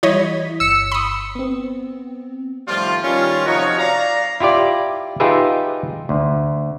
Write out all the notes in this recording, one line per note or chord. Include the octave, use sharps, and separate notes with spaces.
E3 G3 E4 C#5 D#5 B6
G1 E6 C#7
B5 D#6
B3 C4
A2 D#3 F3 G3 F4
D#3 G3 C#4 F4
C3 F3 D#4 F#4 C#5
D5 F5 A#5
E4 F4 G4 D5
D#4 F4 G4 G#4 B4 E5
D2